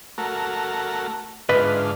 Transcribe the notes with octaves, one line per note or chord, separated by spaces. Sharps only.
A3 F#4 A#4
G#2 D3 F4 B4 D#5 E5